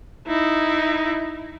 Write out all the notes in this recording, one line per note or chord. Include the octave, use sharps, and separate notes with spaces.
D#4 E4